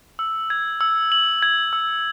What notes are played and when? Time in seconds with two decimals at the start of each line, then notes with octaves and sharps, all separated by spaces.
0.19 E6
0.50 G#6
0.81 E6
1.12 F#7
1.42 G#6
1.73 E6